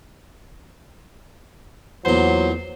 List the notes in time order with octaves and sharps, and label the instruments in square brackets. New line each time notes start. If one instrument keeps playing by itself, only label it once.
[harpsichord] E2 A#2 [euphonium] F#3 [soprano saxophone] C5